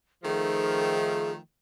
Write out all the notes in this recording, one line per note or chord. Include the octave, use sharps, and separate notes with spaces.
D#3 F3 A3 G#4